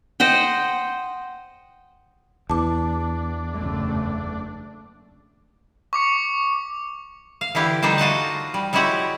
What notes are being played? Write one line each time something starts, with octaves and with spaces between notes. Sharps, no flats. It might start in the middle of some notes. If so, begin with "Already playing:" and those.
C5 D#5 F#5 G5
E2 D4 A5 D6
F#1 A3
C#6 D6 C#7
F5
D3 E3 E4 G4
D3 G3 D4 D#4 C5
F4 F#4 D#5 A5
G3
F#3 G#3 E4 F#4 G4 F#5